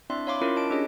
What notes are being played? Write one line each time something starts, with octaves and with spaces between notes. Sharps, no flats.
C4 D4 E4 D5 E5 C6
C#5 F5 B5 C6 D6
C#4 E4 F4 A#4
D#5 A5 D7
C#4 D4 G4 G#4 C#5 D#5